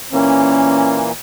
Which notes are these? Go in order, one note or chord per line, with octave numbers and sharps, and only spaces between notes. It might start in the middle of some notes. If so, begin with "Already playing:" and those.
A#2 E3 A#3 C#4